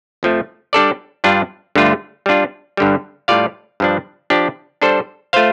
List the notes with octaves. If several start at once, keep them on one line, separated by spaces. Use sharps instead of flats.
F2 F3 A3
G3 D4 A4 D5
G2 G3 D4 F4
G2 D3 A3 F4
G3 D4 F4
G2 D3 G3
A2 G3 F4 D5 F5
G2 F3 D4
F3 D4 G4
G3 D4 A4 C5
A3 F4 C5 F5